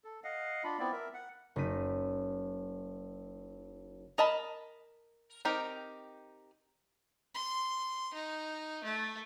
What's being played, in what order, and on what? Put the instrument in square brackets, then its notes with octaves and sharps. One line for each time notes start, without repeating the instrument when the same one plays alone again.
[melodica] A4
D#5 F5 F#5
D4 F4 B5
B3 C4 E4 D5
A#4 E5
F#5
[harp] F#1 D#4 B6 D#7
[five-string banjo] A#4 D#5 A5 B5
C4 D#4 G4 A#4
[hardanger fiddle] C6
D#4
A3